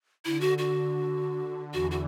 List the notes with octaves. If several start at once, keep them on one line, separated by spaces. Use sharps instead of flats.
D3 E4
F#4
F#4
E2 E3 F#4
F#4